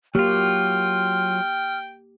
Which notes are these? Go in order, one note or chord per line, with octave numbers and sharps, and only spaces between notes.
F#3 A#3 F4 G4 G5 F6